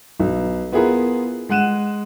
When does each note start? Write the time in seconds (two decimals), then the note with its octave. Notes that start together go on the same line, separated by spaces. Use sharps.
0.20 B1
0.72 B3 E4 F4 G#4 A#4 B4
1.49 G#3 F#5 F#6 D#7 E7